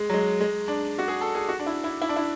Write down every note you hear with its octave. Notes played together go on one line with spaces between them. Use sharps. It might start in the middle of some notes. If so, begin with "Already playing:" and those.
Already playing: G#3
F#3
G#3
G#3
D4
F#4
G#4
A4
G#4
F#4
D4
E4
E4
E4
D4
E4